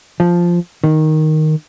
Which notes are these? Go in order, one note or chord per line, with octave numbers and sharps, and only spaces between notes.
F3
D#3